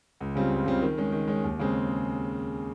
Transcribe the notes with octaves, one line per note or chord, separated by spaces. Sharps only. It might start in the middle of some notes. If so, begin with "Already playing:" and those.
C#2
C#3 G3 C4 F4
C#2
C#3 G3 C4 F4
D#3
G#3 C#4
D#3
G#3 C#4
D#2
C#3 G#3 C4